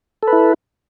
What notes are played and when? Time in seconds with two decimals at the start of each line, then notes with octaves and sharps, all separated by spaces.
0.23 A4
0.28 B4
0.33 E4